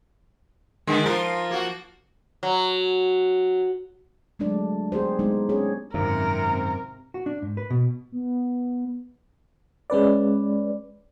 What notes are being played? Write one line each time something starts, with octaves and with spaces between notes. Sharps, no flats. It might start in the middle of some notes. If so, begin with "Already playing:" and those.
D3 D#3 G#3 B3
F3 F4 A#4
A#3 F#4
F#3
F#3 G#3 A3 D4 D5
B3 G4 G#4 C5
G#3 B3 C4 D#4
C#4 G#4 C#5
G#1 F#2 C3 A#4
F#4
D4
G#2
B4
B2
B3
G#3 C#4 B4 D5